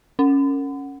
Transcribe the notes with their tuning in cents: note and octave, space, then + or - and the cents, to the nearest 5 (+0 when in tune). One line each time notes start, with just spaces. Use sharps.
C#4 +0 F#5 +0